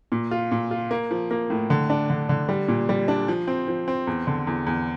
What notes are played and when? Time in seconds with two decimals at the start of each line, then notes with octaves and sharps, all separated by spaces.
0.12 A#2
0.31 F4
0.52 A#2
0.71 F4
0.91 A#3
1.11 F3
1.31 A#3
1.50 A2
1.70 D3
1.90 D4
2.10 D3
2.29 D3
2.49 G3
2.68 A#2
2.89 G3
3.08 D4
3.28 F3
3.48 C4
3.68 F3
3.88 C4
4.07 E2
4.27 D3
4.47 E2
4.66 E2